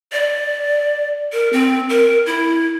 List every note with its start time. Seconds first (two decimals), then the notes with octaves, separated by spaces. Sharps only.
0.13 D5
1.33 A#4
1.53 C4
1.89 A#4
2.26 E4